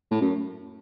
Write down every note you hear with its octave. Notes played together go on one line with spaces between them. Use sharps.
A2
F#2